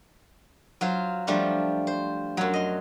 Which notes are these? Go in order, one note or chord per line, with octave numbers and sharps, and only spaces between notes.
F#3 F4 C5
F3 G3 A3 D4 F4
C5
F#2 F#3
D#5 C6